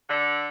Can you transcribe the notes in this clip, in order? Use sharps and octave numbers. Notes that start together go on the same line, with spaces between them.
D3